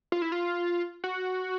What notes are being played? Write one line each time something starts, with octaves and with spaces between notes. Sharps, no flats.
F4
E4
F4
F#4